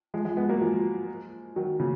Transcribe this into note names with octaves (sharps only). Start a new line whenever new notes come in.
F3 G#3
F3 G#3
G#3 B3
F#3 A#3
F3 G#3
D#3 F#3
A#2 C#3